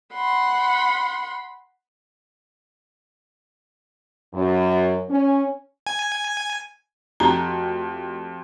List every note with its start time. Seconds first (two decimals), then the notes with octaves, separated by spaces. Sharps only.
0.14 F#5 B5 C6
4.34 F#2
5.10 C#4
5.87 G#5
7.20 F2 A3 F#4 G4 A#5